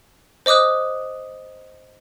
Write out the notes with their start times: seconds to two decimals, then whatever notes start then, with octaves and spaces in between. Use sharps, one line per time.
0.46 C5 D#5 D6 D#6 F#6